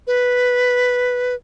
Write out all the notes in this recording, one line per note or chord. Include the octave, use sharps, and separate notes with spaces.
B4